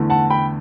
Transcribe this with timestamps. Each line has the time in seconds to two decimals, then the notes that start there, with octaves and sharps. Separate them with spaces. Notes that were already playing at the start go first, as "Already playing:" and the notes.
Already playing: E2 D3 A3
0.10 F#5 A5
0.30 G5 B5